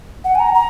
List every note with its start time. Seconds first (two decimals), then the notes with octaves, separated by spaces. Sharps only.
0.24 F#5
0.35 G#5
0.40 A#5
0.54 A#5